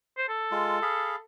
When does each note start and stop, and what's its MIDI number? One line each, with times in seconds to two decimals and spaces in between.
0.18 0.27 72
0.29 1.22 69
0.52 0.79 56
0.52 0.79 65
0.82 1.16 68
0.82 1.16 77
0.82 1.16 83